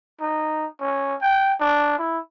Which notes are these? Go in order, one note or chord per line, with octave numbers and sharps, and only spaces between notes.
D#4
C#4
G5
D4
E4